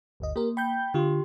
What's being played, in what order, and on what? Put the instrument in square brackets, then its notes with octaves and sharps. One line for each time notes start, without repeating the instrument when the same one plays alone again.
[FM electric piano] G1 D2 D#5
[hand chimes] A#3 [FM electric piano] G4 A#4
[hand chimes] G5 [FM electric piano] B5 G6
[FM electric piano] D3 F4 [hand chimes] G4 C6